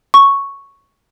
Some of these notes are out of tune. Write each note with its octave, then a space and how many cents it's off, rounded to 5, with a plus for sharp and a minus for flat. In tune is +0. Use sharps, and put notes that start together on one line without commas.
C#6 +0